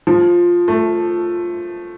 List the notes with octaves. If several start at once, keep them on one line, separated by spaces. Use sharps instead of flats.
F3
A3